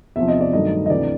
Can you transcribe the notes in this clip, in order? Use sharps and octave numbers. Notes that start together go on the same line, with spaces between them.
E2 C3 F3 E5
D#5
D5
G2 D#3 F#3 A3 D#5
D#5
D2 C3 E3 D5